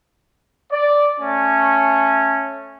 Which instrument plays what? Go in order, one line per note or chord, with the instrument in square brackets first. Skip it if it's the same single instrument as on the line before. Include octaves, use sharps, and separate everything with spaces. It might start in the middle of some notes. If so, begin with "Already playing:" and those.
[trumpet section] D5
A3 C#4